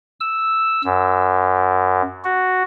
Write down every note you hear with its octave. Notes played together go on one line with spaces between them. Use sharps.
E6
F#2
F#4